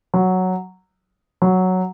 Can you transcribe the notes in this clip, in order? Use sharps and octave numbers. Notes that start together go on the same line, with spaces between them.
F#3
F#3